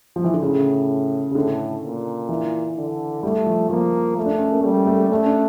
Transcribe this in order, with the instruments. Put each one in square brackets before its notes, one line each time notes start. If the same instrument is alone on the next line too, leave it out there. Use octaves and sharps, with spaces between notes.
[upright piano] F3
E3
D3
[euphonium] A2 [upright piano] C#3
[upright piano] C#3
[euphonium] A2 [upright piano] D3
[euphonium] A#2
[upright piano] E3
[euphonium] D3
[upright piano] G3 [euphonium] A3
[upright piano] F3
[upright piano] F3 [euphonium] A#3
[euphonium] A3
[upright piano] D4
C#4
A#3
[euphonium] G3 [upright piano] A3
[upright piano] A3
[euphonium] A3 [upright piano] C#4
[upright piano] D4